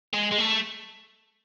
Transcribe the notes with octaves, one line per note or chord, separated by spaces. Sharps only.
G#3
G#3
A3